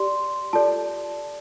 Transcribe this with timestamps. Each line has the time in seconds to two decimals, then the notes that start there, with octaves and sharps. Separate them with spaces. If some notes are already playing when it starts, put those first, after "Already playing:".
Already playing: G4 D5 C6
0.53 F4 A4 D5 A5